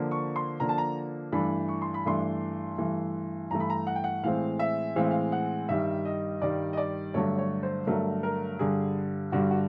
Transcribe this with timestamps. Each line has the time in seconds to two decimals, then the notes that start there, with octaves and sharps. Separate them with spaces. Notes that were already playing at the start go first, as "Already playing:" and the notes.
Already playing: D3 F3 A#3
0.11 C#6
0.36 C6
0.60 D3 F3 A#3 A#5
0.69 A5
0.78 A#5
1.32 G2 E3 A3 D4 B5
1.69 C#6
1.82 C6
1.94 B5
2.05 G2 E3 A3 D4 C6
2.78 G2 E3 A3
3.51 G2 E3 A3 A#5
3.60 B5
3.70 A#5
3.87 F#5
3.95 G5
4.04 F#5
4.23 A2 E3 G#3 C4 F5
4.59 E5
4.96 A2 E3 G#3 C4 F5
5.03 E5
5.11 F5
5.32 F#5
5.69 G2 D#3 G3 E5
6.05 D#5
6.42 G2 D#3 G3 D5
6.73 D#5
6.77 D5
7.14 G2 D3 F#3 A3 C#5
7.38 C#5
7.63 C5
7.87 G2 D3 F#3 A3 A#4
8.23 A#4
8.59 G2 D3 G3 G#4
9.32 G2 D3 G3 F#4
9.51 F#4